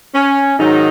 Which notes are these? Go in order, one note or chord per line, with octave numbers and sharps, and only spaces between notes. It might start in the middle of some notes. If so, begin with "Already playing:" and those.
C#4
G#2 D#3 F#3 D#4